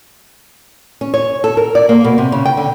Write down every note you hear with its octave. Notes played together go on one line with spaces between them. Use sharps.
C#4
C#5
A4
A#4
D5
A#3
B2
C3
C#3
G5
D3